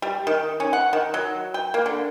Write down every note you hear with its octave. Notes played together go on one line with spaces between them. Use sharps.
G3
D#3
C#4
F#5
D#3
F#3
G5
A#3
D3